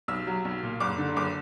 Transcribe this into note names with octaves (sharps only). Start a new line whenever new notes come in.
B1 E6
F#3
B1
A#2
F#1 D6
D3
F#1 D6